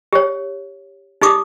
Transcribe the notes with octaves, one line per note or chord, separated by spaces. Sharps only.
G4 C#5
D#4 G4 D6 D#6